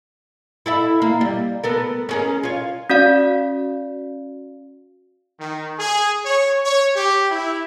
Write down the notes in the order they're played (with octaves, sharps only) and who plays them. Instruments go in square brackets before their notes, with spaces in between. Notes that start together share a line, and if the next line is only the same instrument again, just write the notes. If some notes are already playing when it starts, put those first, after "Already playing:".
[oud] E4 A4 E5
A#3
G3
B3 A4 A#4
C#4 G#4 A#4
F4 C#5
[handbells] C#4 F#4 D5 F5
[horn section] D#3
G#4
C#5
C#5
G4
E4